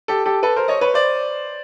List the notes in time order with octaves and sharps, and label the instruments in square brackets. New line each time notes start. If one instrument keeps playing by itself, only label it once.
[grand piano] G4 A4
G4 A4
A4 B4
A#4 C5
C#5 D#5
B4 C#5
C5 D5